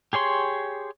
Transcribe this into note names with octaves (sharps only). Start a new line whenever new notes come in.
G4 G#4 C#5 C6